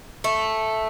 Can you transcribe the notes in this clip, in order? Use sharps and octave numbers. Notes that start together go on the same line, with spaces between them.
A3